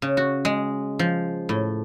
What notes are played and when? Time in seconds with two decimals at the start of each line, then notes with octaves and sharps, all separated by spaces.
0.02 C#3
0.17 F#4
0.45 G#3
0.99 F3
1.49 A2